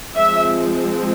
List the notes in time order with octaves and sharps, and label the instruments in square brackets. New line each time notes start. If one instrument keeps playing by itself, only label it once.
[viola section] F3 G#3 C4 E5